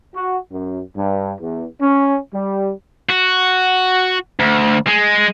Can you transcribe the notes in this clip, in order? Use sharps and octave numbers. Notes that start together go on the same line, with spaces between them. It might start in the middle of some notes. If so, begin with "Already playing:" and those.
F#4
F#2
G2
E2
C#4
G3
F#4
D2
G#3